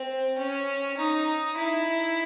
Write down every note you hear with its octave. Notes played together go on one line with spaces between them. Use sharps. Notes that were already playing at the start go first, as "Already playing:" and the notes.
Already playing: C4
C#4
D#4
E4